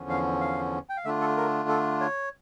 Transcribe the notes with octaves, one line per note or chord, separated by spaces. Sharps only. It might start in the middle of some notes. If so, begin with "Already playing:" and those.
Already playing: E2 D3 F3 C#4
F5
F5
G5
F5
D3 A3 D4 F4 E5
A4
A#4
A4
C#5